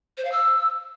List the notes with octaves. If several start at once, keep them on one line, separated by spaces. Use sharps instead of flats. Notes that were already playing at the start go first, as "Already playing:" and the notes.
C5
F5
E6